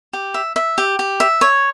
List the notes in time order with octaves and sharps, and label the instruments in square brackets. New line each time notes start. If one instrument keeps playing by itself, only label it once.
[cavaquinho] G4
E5
E5
G4
G4
E5
C#5